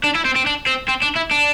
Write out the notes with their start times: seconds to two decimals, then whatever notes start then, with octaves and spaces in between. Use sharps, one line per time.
0.04 D4
0.15 E4
0.25 C4
0.36 C4
0.46 D4
0.67 C4
0.89 C4
1.03 D4
1.16 E4
1.31 D4